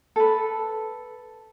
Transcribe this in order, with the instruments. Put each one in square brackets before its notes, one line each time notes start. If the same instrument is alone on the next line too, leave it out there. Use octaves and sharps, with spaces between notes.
[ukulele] A4 B4